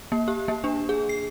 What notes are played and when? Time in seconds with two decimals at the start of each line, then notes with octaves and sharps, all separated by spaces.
0.12 A#3
0.28 G4
0.48 A#3
0.64 D4
0.89 G#4
1.09 C7